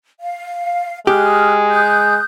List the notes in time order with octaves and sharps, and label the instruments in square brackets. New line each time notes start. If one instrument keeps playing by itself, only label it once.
[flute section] F5
[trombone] G#3 [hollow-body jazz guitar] G4 [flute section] D#6 F6 F#6
[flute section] D#6 F#6 G6